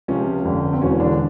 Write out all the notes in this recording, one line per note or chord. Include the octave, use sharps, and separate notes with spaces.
C#2 C3 F3 C#4
F1 F2 D3
C4
E1 E2 B2 C#4
D3 D4